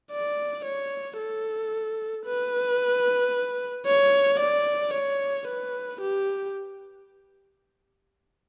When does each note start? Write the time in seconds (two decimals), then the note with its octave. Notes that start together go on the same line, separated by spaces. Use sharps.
0.11 D5
0.65 C#5
1.18 A4
2.25 B4
3.86 C#5
4.39 D5
4.93 C#5
5.47 B4
6.01 G4